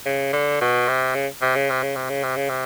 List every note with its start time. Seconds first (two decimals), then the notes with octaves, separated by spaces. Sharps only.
0.06 C#3
0.33 D3
0.61 B2
0.88 C3
1.15 C#3
1.42 C3
1.56 C#3
1.70 C3
1.83 C#3
1.96 C3
2.10 C#3
2.23 C3
2.37 C#3
2.49 C3